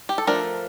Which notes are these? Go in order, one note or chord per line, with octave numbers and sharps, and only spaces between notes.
G4
A4
F3 A3 D4 A#4